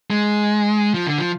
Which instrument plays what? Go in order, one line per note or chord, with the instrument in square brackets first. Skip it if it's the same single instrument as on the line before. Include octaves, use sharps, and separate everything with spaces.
[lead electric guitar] G#3
F3
D3
F3